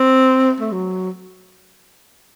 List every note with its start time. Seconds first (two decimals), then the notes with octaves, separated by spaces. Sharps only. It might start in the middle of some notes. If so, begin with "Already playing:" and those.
Already playing: C4
0.60 A3
0.72 F#3